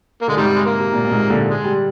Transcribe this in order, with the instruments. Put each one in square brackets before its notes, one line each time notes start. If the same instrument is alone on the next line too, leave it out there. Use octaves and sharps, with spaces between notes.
[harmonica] A#3
[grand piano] D3 [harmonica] G#3
[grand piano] G#2 C3 [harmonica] D#3 G3
[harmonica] G#3
A#3
[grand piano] C3
A#2
A#2
G#2 C3
A#2 D3
[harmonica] G#3
[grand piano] G3